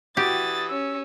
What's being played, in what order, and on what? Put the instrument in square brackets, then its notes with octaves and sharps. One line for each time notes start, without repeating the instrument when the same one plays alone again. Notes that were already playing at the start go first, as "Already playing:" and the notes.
[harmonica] E3 D#6 [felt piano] F#4 [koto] G4 [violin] A6
[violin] C#4 [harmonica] E6